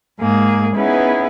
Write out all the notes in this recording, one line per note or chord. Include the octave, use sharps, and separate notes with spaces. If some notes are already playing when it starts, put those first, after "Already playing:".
G#2 A#3 G#4
B3 C#4 D#4 E4 G#4 B4